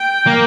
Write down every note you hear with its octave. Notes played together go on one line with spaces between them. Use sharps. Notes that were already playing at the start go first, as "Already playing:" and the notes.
Already playing: G5
A#3